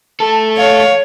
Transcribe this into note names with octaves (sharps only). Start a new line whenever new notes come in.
A3 A4 A5
C#5 F5